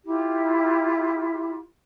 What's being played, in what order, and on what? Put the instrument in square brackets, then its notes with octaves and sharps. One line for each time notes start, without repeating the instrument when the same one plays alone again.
[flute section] E4 F4 G4